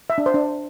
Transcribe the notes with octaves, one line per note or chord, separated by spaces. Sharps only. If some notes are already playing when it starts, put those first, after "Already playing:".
E5
D4
C5
D4